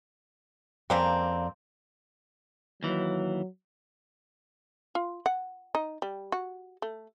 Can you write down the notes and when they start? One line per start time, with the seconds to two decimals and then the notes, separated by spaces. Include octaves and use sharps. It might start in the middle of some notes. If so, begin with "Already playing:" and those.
0.90 F2 C#3 A#3 C4 D5 A#5
2.83 D#2 E3 F#3
4.95 F4
5.26 F#5
5.75 D#4
6.02 G3
6.32 F#4
6.82 A3